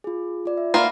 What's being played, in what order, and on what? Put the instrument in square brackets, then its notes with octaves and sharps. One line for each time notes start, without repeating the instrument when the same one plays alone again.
[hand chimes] F4 G#4
F4 D5
E5
[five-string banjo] A#3 F4 [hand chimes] F#5 B5 A#6